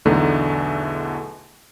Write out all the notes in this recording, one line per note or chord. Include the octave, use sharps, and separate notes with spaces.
B1 E2 D3 A3 D#4 A#5